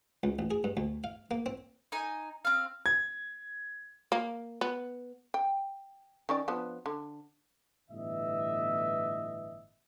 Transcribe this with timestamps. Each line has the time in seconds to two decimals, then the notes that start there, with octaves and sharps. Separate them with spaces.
0.23 C#2
0.39 A1
0.51 G#4
0.64 G2
0.77 D2
1.04 F5
1.31 A#3
1.46 C4
1.92 D#4 G#5
2.45 C4 F5
2.86 G#6
4.12 A#3
4.61 B3
5.34 G5
6.29 D#3 C#4 D5
6.48 F3 B3 D4
6.86 D3
7.90 G1 A2 E3 B3 D#5 E5